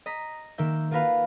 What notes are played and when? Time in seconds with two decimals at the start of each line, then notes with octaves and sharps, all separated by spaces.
0.06 D#5 A#5 B6
0.58 D#3 A#3 E5 G6
0.91 A#3 F4 F#4 A#4 B4 F5